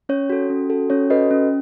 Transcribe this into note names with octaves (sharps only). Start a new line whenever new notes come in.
C#4 C#5
F#4 A4
C#4
F#4 A4
C#4 C#5
F#4 A4 B4 D#5
C#4